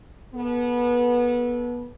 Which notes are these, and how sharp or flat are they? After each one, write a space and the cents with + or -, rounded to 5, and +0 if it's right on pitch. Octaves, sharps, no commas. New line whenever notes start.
B3 -25 A4 -20